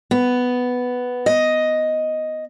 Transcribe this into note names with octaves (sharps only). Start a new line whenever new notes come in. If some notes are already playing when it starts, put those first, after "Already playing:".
B3
D#5